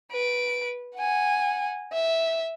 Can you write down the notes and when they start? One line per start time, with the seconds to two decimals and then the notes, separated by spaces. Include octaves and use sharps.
0.11 B4 D7
0.96 F#5 G#5
1.93 E5